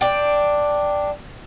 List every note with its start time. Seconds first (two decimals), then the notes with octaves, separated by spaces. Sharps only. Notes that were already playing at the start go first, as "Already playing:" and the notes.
0.01 D4 G5